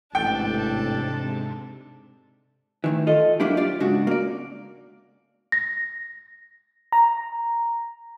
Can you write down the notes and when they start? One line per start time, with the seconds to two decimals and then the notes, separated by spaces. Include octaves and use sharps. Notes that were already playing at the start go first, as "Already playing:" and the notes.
0.15 A1 G#2 C3 D4 A4 G5
2.84 A2 D#3 E3
3.07 F4 A4 D#5
3.40 F#3 A#3 D4 E4 G4
3.57 F4 G4 D5
3.80 G#2 C#3 D4 F#4
4.07 A#3 D5
5.52 A#6
6.92 A#5